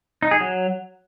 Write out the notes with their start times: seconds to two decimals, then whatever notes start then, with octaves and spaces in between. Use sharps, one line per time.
0.23 D#4
0.31 G#4
0.40 F#3